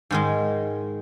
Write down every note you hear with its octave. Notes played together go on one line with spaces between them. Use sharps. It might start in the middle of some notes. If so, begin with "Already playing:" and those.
G#2 D#3 G#3